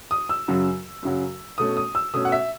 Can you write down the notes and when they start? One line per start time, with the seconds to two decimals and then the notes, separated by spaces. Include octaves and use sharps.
0.11 D#6
0.29 E6
0.48 F#2 C#3 F#3
1.03 F#2 C#3 F#3
1.58 B2 A3 C#4 D#6
1.77 D#6
1.95 E6
2.14 B2 A3 C#4 D#6
2.25 F#5
2.32 E5